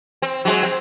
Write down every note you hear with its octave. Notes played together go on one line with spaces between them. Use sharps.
C4
F#3 G#3 C4
C4